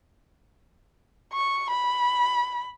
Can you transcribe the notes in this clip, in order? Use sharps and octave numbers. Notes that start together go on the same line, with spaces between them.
C#6
B5